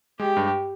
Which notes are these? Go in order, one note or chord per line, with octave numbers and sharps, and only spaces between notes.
G#3 G4
G2